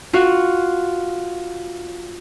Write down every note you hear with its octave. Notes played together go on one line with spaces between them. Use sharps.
F4 F#4 F5